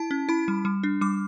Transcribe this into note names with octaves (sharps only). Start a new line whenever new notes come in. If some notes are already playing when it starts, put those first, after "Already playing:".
Already playing: E4 A5
C#4
E4 B5
G3
G3
D4
G3 D6